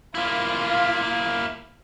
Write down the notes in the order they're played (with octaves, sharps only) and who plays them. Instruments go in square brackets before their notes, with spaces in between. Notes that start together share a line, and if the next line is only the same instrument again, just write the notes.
[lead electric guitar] A#3 E4 [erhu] F4